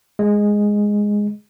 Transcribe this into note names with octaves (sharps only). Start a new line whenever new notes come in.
G#3